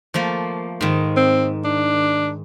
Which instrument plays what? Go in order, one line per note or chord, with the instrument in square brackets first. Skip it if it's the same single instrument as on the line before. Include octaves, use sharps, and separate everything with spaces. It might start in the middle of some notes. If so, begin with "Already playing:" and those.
[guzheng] F3 A3 A#3
G#2 D#3
[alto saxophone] C4
D4